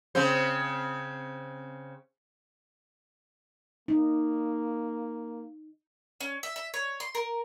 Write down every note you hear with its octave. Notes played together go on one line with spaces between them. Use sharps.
C#3 C4 C5
A#3 D#4
C#4
E5
E5
C#5
C6
A#4